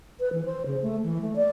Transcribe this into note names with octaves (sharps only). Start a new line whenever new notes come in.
B4
E3
C5
C#3
A3
E3
A3
D5